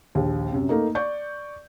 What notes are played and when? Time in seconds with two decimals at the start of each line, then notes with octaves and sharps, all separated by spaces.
0.15 A#1 D#2
0.52 F#2 C3
0.69 A3 A#3 D#4
0.95 D5 C#6 G6